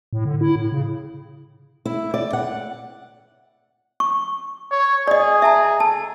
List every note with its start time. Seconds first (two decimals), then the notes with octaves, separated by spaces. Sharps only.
0.13 A2
0.25 D3
0.41 E4
0.56 A2
0.72 C#3
1.85 E4
2.14 D5
2.33 F#5
4.00 C#6
4.71 C#5
5.08 G#4 D5 D#5
5.42 E5 A5 A#5
5.80 A4 A5